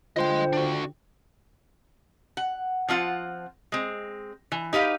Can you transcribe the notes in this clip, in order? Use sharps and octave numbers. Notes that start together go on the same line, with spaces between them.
D3 F4 C5 D#5 G5 C6
D4 F#4
F#5
F3 C4 F4 F#5
G#3 C4
E3
D#4 G4 B4 F5